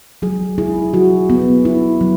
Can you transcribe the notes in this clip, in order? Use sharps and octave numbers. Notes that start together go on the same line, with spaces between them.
F#3 G#4
E4 G#4
F#3 F#4
B3
E4
F#3